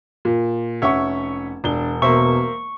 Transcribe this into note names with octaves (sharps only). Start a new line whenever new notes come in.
A#2
F1 C#4 E5 F#5 C#6
E1 D4 G7
B2 A#3 C5 E5 C#6